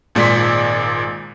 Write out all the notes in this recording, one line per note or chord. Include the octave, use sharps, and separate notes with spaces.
G#1 A#2 G#3 D5 C6 B6